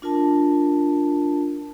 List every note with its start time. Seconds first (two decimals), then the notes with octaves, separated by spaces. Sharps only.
0.02 D4 F4 A#4 A5